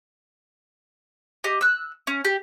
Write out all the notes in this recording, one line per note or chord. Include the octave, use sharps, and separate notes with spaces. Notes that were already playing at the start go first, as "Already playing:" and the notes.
G4 D#5
E6 F#6
C#4
G4